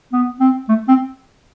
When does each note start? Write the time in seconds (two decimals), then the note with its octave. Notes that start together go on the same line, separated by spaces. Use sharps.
0.13 B3
0.40 C4
0.68 A3
0.88 C4